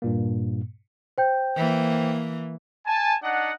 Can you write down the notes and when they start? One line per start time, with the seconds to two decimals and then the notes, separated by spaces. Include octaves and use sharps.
0.02 G2 A#2 A#3
1.18 C5 G5 G6
1.56 E3 A#3
2.86 G#5 A5
3.23 D4 D#4 F#5